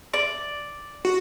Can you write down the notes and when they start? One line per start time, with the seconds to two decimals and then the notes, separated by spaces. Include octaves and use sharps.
0.14 D5
1.05 F#4